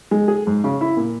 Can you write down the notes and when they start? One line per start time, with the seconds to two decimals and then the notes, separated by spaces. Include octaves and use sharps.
0.11 G#3
0.28 G#4
0.47 G#2
0.64 C#3
0.81 E4
0.97 A#2